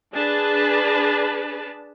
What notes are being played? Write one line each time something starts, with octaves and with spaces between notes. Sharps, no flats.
D4 G#4 B4 A5